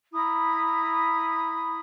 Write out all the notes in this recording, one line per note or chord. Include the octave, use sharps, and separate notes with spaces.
E4 A#5 B5 D#6